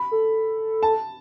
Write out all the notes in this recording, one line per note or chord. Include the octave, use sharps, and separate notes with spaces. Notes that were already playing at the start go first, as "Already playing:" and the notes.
Already playing: B5
A4
A5